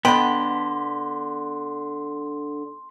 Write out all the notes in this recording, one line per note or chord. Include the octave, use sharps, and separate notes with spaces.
D3 B3 D4 D#5 G5 B5 C6